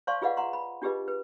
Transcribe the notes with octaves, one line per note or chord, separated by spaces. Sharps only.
C5 D5 F5 A5 C6 C#6
F4 G#4 B4 D#5 F5 F#5
F#5 A#5 C6
B5
D4 F4 G4 G#4 B4 D#5
B4